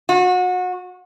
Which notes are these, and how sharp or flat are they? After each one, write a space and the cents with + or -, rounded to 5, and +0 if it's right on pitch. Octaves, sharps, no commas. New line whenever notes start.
F#4 -30